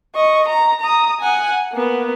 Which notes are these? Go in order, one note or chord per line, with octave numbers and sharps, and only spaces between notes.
D#5 C#6
A#5
A#5 D#6
F#5 G#5
A#3 B3